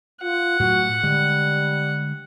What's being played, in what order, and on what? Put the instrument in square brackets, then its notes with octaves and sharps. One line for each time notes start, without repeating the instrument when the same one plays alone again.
[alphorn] F4 [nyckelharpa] F#5
[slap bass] A2 F#3 [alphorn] F#4
[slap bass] D3 G#3 [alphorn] G3